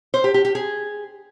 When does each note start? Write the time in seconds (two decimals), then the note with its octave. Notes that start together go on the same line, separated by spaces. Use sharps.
0.14 C5
0.24 G4
0.34 G4
0.45 G4
0.55 G#4